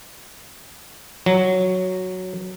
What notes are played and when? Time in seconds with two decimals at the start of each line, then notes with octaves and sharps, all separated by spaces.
1.26 F#3